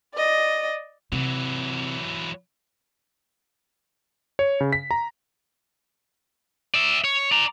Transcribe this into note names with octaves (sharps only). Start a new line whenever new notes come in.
D5 D#5
C3 E3 F#3
C#5
C#3
B6
A#5
D5 E5
C#5
D5 A#5